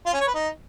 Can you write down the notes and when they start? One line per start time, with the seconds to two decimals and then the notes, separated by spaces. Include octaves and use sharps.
0.06 F4
0.13 C#4
0.20 C#5
0.28 B4
0.35 D#4